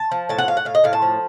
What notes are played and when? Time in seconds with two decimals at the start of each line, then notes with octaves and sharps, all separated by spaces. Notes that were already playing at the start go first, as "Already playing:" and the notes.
Already playing: A5
0.12 F3
0.29 A2 A5
0.38 F#5
0.48 A2 F5
0.57 F#5
0.65 A2 F5
0.75 D#5
0.84 A2 F5
0.93 A5
1.02 F3